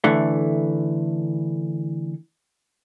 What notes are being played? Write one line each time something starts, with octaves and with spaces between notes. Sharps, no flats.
D3 E3 A3